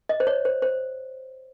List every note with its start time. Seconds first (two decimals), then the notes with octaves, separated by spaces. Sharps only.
0.09 D#5
0.20 C5
0.27 C#5
0.45 C5
0.62 C5